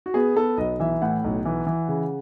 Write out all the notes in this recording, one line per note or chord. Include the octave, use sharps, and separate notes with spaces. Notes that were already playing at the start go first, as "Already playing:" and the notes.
F#4
B3 G#4
B3 A4
B1 D#5
E3 E5
A2 F#5
B1
E3
E3
C#3